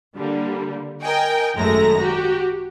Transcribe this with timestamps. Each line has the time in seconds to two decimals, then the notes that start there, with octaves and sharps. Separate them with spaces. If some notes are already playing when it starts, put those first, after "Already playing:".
0.16 D3 G3 A#3
1.02 A#4 D#5 G5 G#5
1.56 G#1 F#2 G#3 A3 A#5 A#6
2.00 F#4 G4